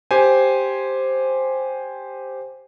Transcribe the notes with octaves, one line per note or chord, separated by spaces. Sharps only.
G4 C5 G#5